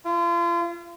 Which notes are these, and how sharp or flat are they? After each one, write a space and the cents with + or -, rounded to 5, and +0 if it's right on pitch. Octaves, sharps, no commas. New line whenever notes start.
F4 -35